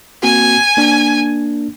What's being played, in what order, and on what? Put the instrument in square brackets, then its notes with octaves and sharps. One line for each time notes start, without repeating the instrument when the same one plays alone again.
[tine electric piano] A#3 C4 F#4 [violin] G#5
[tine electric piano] A#3 D4